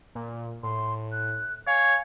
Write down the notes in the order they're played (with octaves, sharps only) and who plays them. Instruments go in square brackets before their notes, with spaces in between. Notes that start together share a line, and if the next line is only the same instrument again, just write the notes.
[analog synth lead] A#2
[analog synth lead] A2 [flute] C6
[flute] F#6
[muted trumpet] C#5 [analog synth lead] F5 [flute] G#5